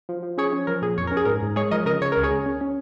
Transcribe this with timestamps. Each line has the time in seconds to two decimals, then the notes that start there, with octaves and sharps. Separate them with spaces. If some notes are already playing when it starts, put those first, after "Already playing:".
0.09 F3
0.23 F3
0.37 C#4 G#4 C#5
0.53 C#4
0.67 F3 A#4
0.82 A#2 G#4
0.98 F2 C#5
1.07 C#4 A#4
1.17 G#4
1.25 G#2 A#4
1.42 G#2
1.56 G#3 G#4 C#5
1.71 F3 A#4 D#5
1.86 C#3 A#4 D#5
2.01 C#3 C#5
2.12 C#2 A#4
2.23 G#4 C#5
2.31 C#3
2.46 C#4
2.61 C#4